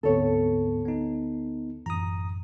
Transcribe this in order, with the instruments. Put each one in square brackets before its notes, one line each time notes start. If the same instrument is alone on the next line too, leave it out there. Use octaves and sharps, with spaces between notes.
[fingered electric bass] D2 C4 [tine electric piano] G#2 B3 [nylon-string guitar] A4 C#5
[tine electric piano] B3 D#4
[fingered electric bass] A1 F#2 E3 [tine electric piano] A#5 D#6